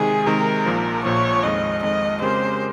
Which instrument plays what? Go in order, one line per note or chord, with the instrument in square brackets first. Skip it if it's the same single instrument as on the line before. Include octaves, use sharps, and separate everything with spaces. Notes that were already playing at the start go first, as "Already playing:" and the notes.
Already playing: [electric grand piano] C3 D#3 G#3 [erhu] G#4
[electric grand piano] C3 D#3 G#3 [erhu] A#4
[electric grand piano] A#1 A#2 F3
[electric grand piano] A#1 A#2 F3 [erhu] C#5
[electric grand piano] F2 D#3 G#3 [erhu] D#5
[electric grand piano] F2 D#3 G#3 [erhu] D#5
[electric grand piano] C#3 G#3 C4 G4 A#4 [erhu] C5